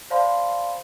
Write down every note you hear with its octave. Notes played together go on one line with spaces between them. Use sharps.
C5 D5 F5 A5 B5 C6